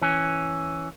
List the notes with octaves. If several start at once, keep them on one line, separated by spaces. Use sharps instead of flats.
E3 C#4